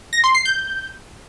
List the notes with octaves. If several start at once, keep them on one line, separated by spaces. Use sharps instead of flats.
A#6
C6
C7
G6